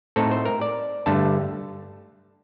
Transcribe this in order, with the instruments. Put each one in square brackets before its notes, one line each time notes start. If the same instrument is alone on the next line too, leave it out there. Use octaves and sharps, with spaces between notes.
[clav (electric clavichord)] A2 A3 C4 D#4 A4
C5
A#4
D5
G2 D3 A3 A5